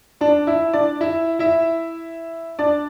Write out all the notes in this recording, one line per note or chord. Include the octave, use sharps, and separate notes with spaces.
D4 D5
E4 E5
D4 D5
E4 E5
E4 E5
D4 D5